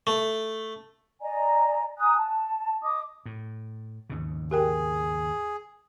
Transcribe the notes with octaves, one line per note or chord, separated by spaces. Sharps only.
A3
D5 D#5 G#5 A#5
G#5 A#5 D#6 F#6
A5
D#5 D6 D#6
A2
D#2 G#2 C#3
G4 G#4 A#4 G5